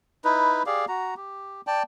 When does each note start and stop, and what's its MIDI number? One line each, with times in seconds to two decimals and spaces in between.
0.25 0.63 63
0.25 0.63 64
0.25 0.63 71
0.66 0.85 67
0.66 0.85 68
0.66 0.85 74
0.66 0.85 77
0.88 1.14 66
0.88 1.14 82
1.17 1.61 67
1.67 1.83 74
1.67 1.83 79
1.67 1.83 81